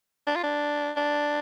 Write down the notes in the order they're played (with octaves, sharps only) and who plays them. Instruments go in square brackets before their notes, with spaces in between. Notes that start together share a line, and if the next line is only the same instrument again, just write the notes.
[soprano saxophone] D4
F4
D4
D4